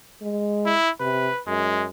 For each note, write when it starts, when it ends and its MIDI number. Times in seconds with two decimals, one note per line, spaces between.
0.22 0.73 56
0.66 0.90 64
1.00 1.29 48
1.00 1.41 71
1.47 1.87 42
1.47 1.86 56